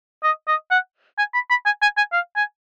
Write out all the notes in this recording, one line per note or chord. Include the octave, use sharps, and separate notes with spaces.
D#5
D#5
F#5
G#5
B5
B5
G#5
G#5
G#5
F5
G#5